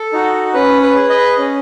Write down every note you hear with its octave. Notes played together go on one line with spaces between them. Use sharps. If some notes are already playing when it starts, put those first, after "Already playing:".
Already playing: A4
D#4 F#4
C#4 B4
B4
G#4
B4 D#5
C#4